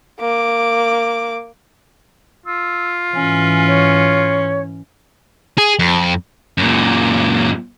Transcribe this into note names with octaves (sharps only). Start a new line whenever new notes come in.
A#3 D6
F4 E6
G#2 E3 C#4 G#5
C#5
G#4
F2
F#2 A#2